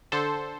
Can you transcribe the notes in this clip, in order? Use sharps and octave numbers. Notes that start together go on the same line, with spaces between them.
D3 A4 C5